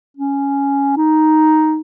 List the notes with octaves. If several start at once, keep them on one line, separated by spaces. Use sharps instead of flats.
C#4
D#4